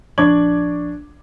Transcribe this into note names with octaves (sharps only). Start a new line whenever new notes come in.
A#1 D4 C#6 D6 G#6 F#7